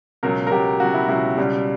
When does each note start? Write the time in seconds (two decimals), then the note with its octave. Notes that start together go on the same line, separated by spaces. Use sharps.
0.23 C#2 B2 F#3 A#4
0.47 A#4
0.51 C#2 B2 F#3 G4
0.80 C#2 B2 F#3 F#4
0.94 E4
1.08 C#2 B2 F#3 E4
1.37 C#2 B2 G3